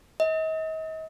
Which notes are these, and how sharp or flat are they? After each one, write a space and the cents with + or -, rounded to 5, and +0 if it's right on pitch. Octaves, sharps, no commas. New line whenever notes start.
D#5 +40